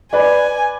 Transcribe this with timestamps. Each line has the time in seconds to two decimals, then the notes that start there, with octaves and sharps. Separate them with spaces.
0.13 B4 D5 G#5